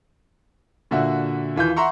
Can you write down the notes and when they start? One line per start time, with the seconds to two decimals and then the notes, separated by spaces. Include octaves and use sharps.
0.91 A#2 D3 F#4 E5
1.56 D#2 E3 F4 G6
1.76 E5 F#5 A#5 C6 C#6